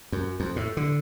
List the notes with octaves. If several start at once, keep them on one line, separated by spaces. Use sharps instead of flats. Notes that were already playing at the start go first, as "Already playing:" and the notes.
F#2
F2
A2
D3